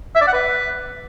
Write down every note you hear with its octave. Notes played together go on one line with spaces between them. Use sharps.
E5
D5
F#5
B4